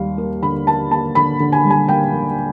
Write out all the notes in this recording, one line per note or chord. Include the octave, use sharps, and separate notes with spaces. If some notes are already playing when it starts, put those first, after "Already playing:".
Already playing: D#2 G3 F5
A#3
D3 B5
A#3 A5
A#3 A5
D3 B5
D3
G#5
G3
G#5
A#3 G5
D3